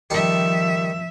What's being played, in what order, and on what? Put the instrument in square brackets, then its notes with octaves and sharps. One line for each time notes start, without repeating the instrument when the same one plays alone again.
[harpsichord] D#3 G3 A4 [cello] F3 E5